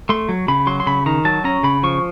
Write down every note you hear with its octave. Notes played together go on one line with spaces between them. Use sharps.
A3 C6
F#3
C#3 B5
F#3 C6
C6
C#3 B5
D#3 A#5
F#3 A5
C#4 A#5
C#3 B5
F3 C#6